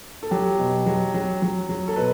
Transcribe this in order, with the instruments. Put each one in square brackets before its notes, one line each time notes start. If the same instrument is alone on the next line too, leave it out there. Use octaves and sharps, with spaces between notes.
[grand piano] A4
F#3 G4
B2
F#3
F#3
F#3
F#3
A4
B2 B4